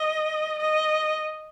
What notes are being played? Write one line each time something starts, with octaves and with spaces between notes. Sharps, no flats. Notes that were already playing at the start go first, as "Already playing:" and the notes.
Already playing: D#5
D#5